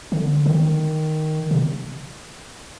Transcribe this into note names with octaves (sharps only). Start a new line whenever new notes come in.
D3
D#3
C3